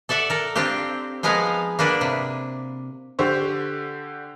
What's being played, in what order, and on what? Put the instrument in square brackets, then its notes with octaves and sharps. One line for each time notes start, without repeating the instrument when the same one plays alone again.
[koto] A4 D5 E5 F#5
A4 A#4
C4 D4 F4 G4
F3 G#3 B3 A#4 F5 G#5
A#3 B3 D4 B4
C3
[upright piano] D3 G4 C5 C#6